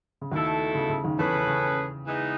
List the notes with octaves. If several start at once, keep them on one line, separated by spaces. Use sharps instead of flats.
C#3
D#2 B2 D#3 A3 E4 A4
C#3
C#3
D#2 D#3
E2 E3 A3 C#4 G#4 B4
C#3
C#3
E3 G#3 B3 D#4